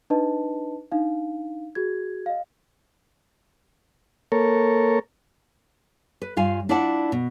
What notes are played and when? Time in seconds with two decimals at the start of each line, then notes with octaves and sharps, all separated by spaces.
0.10 D4 D#4 B4 D#5 A5
0.92 D4 D#4 F5
1.75 F#4 G#4 G#6
2.26 D#5 F5
4.32 A#3 A4 A#4 C#5
6.22 B4
6.37 G2 F4 F5 G#5
6.69 D4 E4 F4 D5 F#5 A5
7.12 B2